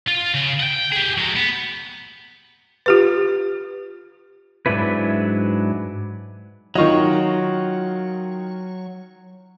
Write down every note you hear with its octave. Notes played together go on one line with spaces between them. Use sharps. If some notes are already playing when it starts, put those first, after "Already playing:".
F4
C#3
F#5 G5
G4 G#4
F#3 G#3
B3
F4 G4 B4
G#2 F#3 D4 E4 B4
D#3 F#3 F4 D#5 C#6